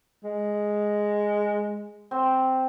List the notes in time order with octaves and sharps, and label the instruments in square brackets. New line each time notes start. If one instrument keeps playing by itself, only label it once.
[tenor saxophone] G#3
[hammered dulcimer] C4